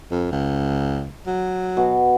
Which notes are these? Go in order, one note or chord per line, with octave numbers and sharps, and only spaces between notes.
F2
C#2
F#3
B2